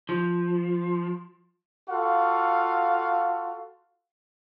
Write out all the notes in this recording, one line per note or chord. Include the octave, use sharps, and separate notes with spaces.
F3
F4 F#4 A4 F5